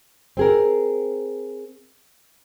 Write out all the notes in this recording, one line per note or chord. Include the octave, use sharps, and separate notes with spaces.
C4 G#4 A#4